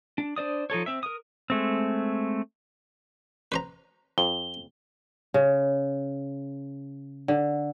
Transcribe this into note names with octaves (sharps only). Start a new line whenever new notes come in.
D4
D4 C5 D5 D#6
F3 D#4 A4 C#5
C4 E5
A#4 D#6
G#3 A3 C4
B4 C5 A#5
F2 G7
C#3
D3